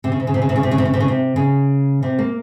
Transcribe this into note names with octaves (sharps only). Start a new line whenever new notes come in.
C3
C#3
C3
C#3
C3
C#3
C3
C#3
C3
C#3
C3
C#3
C3
C#3
C3
C#3
C3
A#3